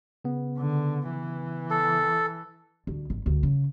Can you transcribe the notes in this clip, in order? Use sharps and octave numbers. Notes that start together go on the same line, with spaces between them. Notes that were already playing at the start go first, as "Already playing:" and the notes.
C#3 B3
D3
E3
A4
D2
G#1
D2
C#3